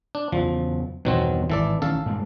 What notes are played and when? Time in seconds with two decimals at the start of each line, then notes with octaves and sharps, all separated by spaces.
0.15 D4
0.32 E2 C#3 F3 F#3
1.05 E2 G2 B2 D#3 F#3 C4
1.50 G#1 E3 A4 D5
1.82 A1 D#3 C#4 A4 F5
2.06 G2 G#3 A#3